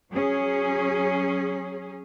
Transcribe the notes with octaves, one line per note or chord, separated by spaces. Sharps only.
F#3 C#4 G#4